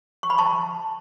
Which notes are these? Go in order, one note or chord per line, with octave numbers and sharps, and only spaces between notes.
C#6
B5
A5 C#6